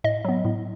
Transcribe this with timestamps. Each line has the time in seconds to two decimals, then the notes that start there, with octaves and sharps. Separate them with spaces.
0.04 A2 D#5
0.25 F#3 B3
0.45 A2